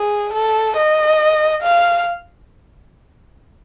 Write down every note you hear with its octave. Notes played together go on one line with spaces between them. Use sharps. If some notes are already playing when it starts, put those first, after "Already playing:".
Already playing: G#4
A4
D#5
F5